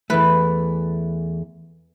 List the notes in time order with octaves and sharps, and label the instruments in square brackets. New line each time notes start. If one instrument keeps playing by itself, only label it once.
[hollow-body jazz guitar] E2 E3 A3 [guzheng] B4